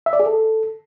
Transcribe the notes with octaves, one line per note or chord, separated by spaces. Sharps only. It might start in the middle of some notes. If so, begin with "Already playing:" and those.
E5
D5
G#4
A4